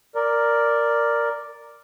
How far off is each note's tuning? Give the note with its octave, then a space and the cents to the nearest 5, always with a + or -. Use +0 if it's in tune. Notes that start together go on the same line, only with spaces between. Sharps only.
A#4 +0 D5 +0